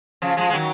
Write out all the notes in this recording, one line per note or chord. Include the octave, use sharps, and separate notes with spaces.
C#3 F3
F3 G#3
G#3
D#3 F#3